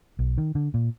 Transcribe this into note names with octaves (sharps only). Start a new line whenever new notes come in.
B1
D#3
D3
A#2